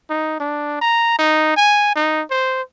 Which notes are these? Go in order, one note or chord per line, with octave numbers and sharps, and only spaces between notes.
D#4
D4
A#5
D#4
G#5
D#4
C5